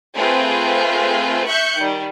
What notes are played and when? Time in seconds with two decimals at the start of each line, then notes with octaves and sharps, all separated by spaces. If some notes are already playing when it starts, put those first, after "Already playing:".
0.15 A3 C4 F4 G#4 B4
1.47 E5 C#6 F#6 G6 C#7
1.78 D#3 G3